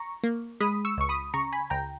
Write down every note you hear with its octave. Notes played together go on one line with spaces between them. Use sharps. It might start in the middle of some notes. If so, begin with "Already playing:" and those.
Already playing: A#5 C#6
A#3
G#3 B5 D#6
C#6 E6
C#2 C#6
B5 D#6
C#3 A#5 C#6
G#5 B5
C#2 G5 A#5